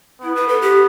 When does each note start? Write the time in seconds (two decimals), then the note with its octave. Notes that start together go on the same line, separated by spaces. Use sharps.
0.22 B3 E4
0.35 B4
0.48 A4
0.62 G4